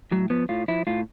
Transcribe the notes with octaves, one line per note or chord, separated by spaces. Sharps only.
A2 F#3
F3 B3
A2 F4
F3 E4
A2 F4